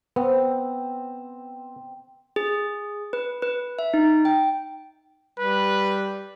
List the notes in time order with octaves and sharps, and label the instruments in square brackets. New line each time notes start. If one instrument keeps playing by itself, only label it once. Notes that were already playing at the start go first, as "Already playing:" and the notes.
[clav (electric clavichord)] B3 [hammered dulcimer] C4
[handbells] G#4
B4
B4
E5
D#4
G5
[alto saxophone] G3 [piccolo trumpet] B4